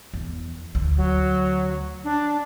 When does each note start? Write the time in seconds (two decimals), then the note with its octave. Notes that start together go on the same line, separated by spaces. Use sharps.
0.14 E2
0.75 D2
0.97 F#3
2.04 D4